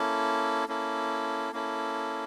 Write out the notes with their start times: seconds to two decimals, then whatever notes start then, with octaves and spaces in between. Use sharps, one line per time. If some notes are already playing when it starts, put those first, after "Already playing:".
Already playing: A#3 C#4 E4 A4
0.68 A#3 C#4 E4 A4
1.53 A#3 C#4 E4 A4